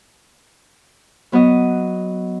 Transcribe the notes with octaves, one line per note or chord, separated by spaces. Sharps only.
F#3 B3 F#4 D#5